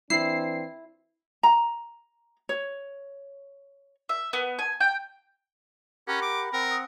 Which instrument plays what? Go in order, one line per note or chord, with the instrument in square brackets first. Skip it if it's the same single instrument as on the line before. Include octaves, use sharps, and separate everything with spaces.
[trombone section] E3 C4 D4 [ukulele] E4 [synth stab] C7
[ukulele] A#5
C#5
[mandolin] E5
B3
G#5
G5
[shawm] C#4 [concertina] G4 A#4 F#5 [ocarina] B5
[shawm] D6
[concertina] C4 F#5 [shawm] A#4
[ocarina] D#6